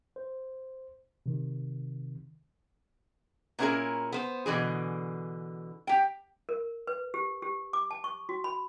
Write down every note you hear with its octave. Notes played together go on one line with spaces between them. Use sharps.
C5
C3 D#3
A#2 B3 C#4 E4 G#4 A#4
B3 C5
B2 D3 E3 G#4
G4 G5
A#4
B4
G4
G4
D6
A5
C#6
F#4
B5